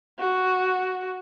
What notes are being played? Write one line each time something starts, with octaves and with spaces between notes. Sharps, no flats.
F#4